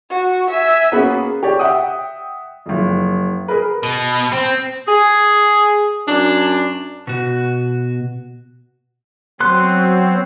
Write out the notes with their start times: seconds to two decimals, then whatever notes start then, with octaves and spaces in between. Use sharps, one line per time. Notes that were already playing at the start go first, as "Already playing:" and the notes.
0.10 F#4
0.50 E5 G#5
0.92 A#3 B3 C#4 F#4 G#4 B4
1.43 G4 C#5 D5
1.59 E5 F#5 G5 D#6
2.66 F#1 F2
3.48 G#4 A#4 B4
3.83 B2
4.33 C4
4.87 G#4
6.07 F#2 D4
7.07 B2 F#4
9.40 F#3 B3 C4 C6 F#6